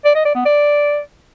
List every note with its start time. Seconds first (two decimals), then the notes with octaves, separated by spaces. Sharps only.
0.05 D5
0.15 D#5
0.25 D5
0.35 B3
0.45 D5